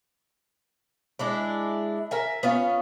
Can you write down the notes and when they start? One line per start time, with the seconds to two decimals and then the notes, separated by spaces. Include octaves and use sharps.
1.19 G#3 D4 E4
2.11 A#4 E5 G#5
2.43 B3 C#4 F4